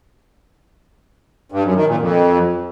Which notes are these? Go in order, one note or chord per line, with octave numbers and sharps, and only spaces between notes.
G2
F#2
D#3
A#2
F2